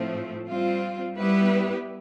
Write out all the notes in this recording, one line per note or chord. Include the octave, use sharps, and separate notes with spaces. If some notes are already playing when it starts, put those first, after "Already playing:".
Already playing: A2 F3 A3 C4
G3 C4 F4
G3 B3 E4 G4 B4